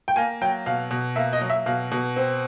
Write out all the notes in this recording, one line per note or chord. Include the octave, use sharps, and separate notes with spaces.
G5
A#3 G#5
F#3 G5
B2 F5
B2
A#3 E5
D#5
F#3
E5
B2 F5
B2
C4